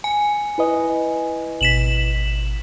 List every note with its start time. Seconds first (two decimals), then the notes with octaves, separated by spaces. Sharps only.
0.04 G#5
0.58 E4 B4 D#5
1.61 G#1 B2 B6 E7 F#7